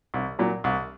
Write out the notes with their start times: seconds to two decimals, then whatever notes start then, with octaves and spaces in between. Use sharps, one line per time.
0.14 C2
0.39 A#2 F#3
0.64 C2